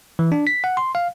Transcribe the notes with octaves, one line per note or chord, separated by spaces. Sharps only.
E3
D4
B6
F#5
C6
F5